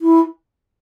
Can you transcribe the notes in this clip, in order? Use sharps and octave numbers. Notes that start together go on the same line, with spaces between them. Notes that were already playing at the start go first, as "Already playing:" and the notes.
E4